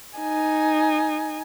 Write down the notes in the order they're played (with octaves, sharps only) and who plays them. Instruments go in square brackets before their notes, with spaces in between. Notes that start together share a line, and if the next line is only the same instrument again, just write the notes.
[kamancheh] D#4 G#5